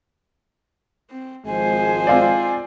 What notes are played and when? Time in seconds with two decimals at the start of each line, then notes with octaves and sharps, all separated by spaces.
1.11 C4
1.46 G#1 F3 G#3 C5 G#5
2.07 C4 F4 D5